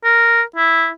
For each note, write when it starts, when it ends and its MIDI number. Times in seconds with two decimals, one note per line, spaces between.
0.04 0.42 70
0.56 0.89 64